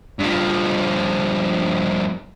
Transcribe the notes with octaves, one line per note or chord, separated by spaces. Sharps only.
G2 F3